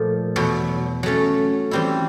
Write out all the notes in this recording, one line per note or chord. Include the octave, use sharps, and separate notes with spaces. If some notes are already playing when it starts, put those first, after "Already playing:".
Already playing: A#2 F3 A3
E2 B2 F#3
F#3 A3 C#4
E3 G3 C4 E4